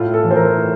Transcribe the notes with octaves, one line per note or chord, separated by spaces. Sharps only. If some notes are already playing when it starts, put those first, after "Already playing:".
Already playing: A2 F4
A4
E3
C5
A#4
A2